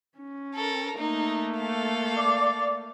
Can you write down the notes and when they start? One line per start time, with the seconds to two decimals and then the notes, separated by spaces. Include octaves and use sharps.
0.18 C#4
0.55 A4 A#4
0.98 A3 A#3 D#4
1.58 A4 F5
2.18 D5